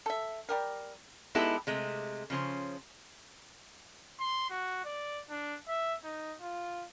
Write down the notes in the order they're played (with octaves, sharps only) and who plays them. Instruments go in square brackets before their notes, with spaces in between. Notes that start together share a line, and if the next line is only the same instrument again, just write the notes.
[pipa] A4 E5
G3 G4 A#4
[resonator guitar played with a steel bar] G#3 B3 D#4 E4 G4 A4
C3 G#3 A3
C#3 F3 C#4 C5
[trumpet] C6
F#4
D5
D4
E5
D#4
F4